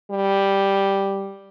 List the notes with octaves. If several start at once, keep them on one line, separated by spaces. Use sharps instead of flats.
G3